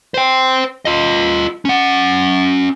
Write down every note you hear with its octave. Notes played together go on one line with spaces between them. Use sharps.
C5 G5
F4 D#5
C#4 F#5